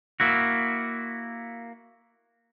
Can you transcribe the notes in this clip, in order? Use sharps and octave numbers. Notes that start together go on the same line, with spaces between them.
A#3 E4 F#4